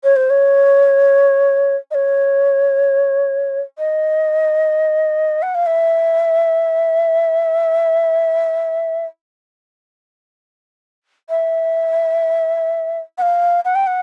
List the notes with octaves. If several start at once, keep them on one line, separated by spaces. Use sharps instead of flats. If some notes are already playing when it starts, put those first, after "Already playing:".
C#5
C5
C#5
D#5
C#5
D#5
F#5
F5
E5
E5
F#5
F5
F#5
G5
F#5